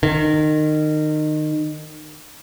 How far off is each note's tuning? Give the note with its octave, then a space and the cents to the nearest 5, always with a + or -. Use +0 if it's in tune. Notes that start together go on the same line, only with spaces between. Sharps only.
D#3 -25